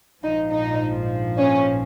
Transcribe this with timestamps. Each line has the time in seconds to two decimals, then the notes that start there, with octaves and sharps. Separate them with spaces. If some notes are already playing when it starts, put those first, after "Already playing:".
0.22 A#1 G#2 F3 D#4
0.51 D#4
1.38 C#4